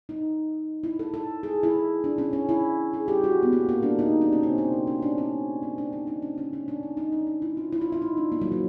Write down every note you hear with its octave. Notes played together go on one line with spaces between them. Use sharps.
D#4
E4
A4
A4
G#4
E4
D4
C#4
C#4
E4
G#4
G4
F#4
B3
A#3
A#3
D4
D#4
D4
C#4
C4
C4
C#4
C#4
D4
C#4
C4
D4
D#4
D4
C#4
C#4
C#4
D4
D#4
D#4
D4
D#4
E4
F4
E4
F4
E4
D#4
D4
A#3
F#3
F3